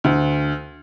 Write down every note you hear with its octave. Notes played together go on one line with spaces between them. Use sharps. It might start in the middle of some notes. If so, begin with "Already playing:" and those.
D2